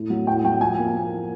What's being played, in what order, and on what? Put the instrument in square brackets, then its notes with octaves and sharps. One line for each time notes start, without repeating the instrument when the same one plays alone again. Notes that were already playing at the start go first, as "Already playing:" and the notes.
Already playing: [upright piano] A2
F#3
A2 G5
F#3 G5
F3 G#5
A#3